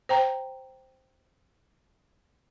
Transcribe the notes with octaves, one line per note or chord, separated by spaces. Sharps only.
C5 G5 A#5